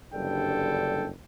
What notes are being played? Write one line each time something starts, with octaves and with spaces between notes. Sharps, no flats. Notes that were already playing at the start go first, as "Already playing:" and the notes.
F#1 G2 D3 G3 A4 G5